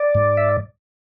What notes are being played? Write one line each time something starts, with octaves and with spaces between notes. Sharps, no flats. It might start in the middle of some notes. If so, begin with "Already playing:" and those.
Already playing: D5
G#2
E5